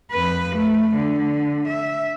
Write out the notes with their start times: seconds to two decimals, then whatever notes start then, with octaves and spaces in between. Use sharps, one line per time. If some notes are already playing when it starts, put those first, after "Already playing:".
0.11 F2 B4
0.56 A3
0.96 D3
1.68 E5